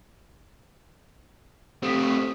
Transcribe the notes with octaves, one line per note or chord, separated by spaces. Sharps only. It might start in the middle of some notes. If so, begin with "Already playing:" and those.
A3 C4 G4 D#6 B6